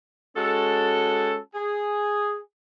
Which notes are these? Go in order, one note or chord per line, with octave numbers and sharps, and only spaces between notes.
G#3 C#4 F#4 A4
G#4